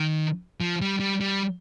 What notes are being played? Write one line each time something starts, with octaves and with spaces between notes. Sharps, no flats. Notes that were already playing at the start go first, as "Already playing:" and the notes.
Already playing: D#3
F3
G3
G3
G3